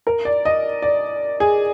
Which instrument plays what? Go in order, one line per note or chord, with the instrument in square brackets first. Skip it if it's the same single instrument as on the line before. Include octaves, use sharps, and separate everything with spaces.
[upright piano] A#4
D5
D#5
D5
G#4